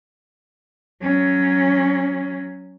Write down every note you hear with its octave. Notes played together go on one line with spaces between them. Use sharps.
F#3 C#4